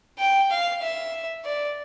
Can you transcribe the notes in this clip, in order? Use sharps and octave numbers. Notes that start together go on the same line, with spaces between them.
G5
F5
E5
D5